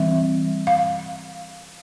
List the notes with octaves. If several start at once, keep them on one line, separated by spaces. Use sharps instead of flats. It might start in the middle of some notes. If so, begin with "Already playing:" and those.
Already playing: E3 G3 C4 E5
F5